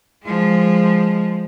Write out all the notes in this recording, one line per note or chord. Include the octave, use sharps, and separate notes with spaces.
F3 G#3